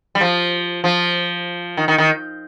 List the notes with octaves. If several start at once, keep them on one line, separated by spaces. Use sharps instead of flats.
G3
F3
F3
D#3
D#3
D#3